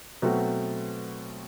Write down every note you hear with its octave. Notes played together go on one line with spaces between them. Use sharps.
B2 F#3 A3 C4 F#4